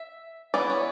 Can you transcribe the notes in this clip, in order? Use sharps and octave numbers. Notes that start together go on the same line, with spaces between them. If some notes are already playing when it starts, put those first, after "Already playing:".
Already playing: E5
E3 B3 E4 D5
C#5